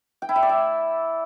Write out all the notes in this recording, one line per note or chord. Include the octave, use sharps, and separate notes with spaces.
G5
E4
E5
D5
E5